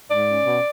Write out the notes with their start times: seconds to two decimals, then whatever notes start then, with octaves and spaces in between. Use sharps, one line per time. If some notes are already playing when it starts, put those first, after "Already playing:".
0.09 G#2 D5
0.27 C#4
0.44 B2